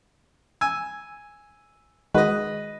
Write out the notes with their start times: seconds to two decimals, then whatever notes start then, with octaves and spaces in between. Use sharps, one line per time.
0.61 G#5 E6
2.14 D#3 G#3 F#4 B4 D#5